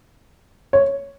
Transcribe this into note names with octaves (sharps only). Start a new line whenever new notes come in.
C#5